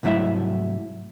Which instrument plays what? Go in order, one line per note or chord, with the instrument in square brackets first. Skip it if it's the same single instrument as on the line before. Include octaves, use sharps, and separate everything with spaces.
[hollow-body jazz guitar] C2 G#2 F#3 A3 E4 E5